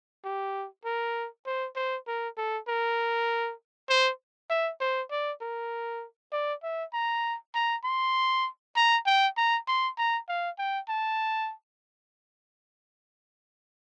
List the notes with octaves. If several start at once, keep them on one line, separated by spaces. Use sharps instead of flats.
G4
A#4
C5
C5
A#4
A4
A#4
C5
E5
C5
D5
A#4
D5
E5
A#5
A#5
C6
A#5
G5
A#5
C6
A#5
F5
G5
A5